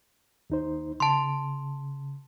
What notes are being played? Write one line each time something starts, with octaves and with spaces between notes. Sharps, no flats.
D#2 D#4 C5
C#3 A5 C6